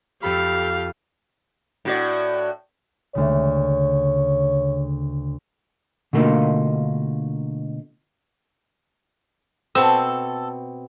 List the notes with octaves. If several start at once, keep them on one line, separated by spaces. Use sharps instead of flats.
F2 G4 A4 F5 B5
A2 F#4 D5
D2 C#3 C#5
B2 D3 A3 A#3 D#4 F4
B2 C4 A4 E6